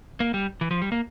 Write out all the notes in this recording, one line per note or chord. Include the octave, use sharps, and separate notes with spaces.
A#3
G3
E3
F3
G3
A#3